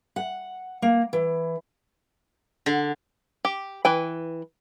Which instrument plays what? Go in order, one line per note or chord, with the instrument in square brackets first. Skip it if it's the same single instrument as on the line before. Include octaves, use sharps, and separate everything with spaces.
[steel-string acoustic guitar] F#5
A#3
E3
[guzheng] D3
[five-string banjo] G4
E3 B4 G5